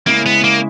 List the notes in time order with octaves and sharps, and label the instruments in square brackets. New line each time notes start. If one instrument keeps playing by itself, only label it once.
[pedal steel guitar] C#3 G#3 C#4 E4 [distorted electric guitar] A#3
[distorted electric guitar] B3
A#3